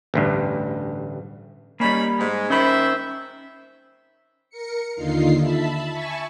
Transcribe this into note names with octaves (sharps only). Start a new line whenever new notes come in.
A1 D2 G2
G3 A#3 C#4 D#4 B5
G#2 G#3
D#3 C#4 C5 E5 B5
A#4 C#7
D#2 D3 D#4 F4 C7
E5 A5 B5
E5 G#5 A5 B5 C#6